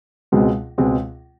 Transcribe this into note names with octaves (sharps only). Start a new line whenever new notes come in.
C#2 B2 G#3 C4
C#2 B2 G#3 C4